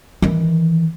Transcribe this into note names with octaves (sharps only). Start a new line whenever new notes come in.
D#3 E3